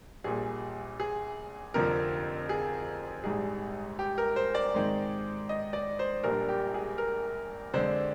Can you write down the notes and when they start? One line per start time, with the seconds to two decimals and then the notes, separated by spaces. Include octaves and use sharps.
0.24 A#1 A#2 G3 G#4
1.00 G#4
1.74 F1 F2 D3 F3 A#4
2.49 G#4
3.24 A#1 G#2 G3 G#4
3.99 G4
4.18 A#4
4.36 C5
4.55 D5
4.74 G#2 D#3 G#3 C4
5.49 D#5
5.73 D5
5.99 C5
6.23 A#1 A#2 G3 D4 A#4
6.49 G4
6.74 G#4
6.98 A#4
7.74 F2 D3 G#3 D4 C5